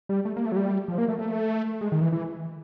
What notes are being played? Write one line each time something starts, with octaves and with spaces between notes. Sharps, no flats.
G3
A3
A#3
A3
F#3
G3
F3
A#3
A3
A3
G#3
D#3
E3
E3